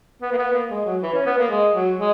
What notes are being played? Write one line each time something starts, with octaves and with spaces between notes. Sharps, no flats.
B3
A#3
B3
A#3
G#3
F#3
E3
C#4
B3
A#3
G#3
F#3
G#3